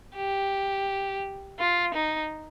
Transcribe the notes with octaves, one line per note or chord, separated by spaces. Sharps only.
G4
F4
D#4